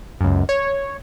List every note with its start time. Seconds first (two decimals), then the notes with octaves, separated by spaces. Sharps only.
0.21 C#2 F#2
0.49 C#5